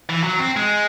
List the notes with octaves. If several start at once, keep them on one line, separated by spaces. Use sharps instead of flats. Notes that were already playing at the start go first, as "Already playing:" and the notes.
E3
F#3
C4
G#3